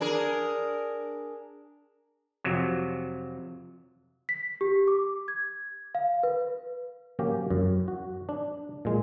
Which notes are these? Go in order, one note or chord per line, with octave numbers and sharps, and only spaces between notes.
D4 G#4 A#4
F2 C3 F#3
B6
G4
D6
G#6
F5
B4
F#3 A#3 C#4 G4 A#4
F#2
F#4
D4
A#2 G#3